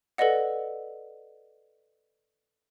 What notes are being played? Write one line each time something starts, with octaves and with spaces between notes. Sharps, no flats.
A4 B4 D5 D#5 F#5